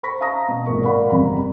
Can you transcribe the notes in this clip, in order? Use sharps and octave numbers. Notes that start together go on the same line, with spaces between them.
C5 B5 C#6 A#6 B6
E5 F5 A5 A#5 D#6 A#6
B2
G#1 A#2 A#4 C#6
A#4 D5 F5 F#5 B5
G1 F2 C3 A#5 B5